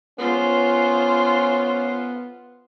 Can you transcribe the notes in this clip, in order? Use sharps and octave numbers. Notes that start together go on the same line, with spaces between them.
B3 C#4 F4 C5